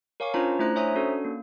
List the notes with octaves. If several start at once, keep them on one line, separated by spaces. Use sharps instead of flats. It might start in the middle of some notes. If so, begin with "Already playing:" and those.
A#4 C#5 F5 G#5 C#6 D6
C#4 D4 F4 C5 A5 A#5
A3 D4 E4 C5 A#5 F#6
C5 C#5 E5 G#5 A#5 D#6
C#4 D4 F#4 A4
A#3